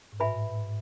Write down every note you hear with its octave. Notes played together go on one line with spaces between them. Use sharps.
G#2
A2 F#4 B4 E5 G#5 B5
G#2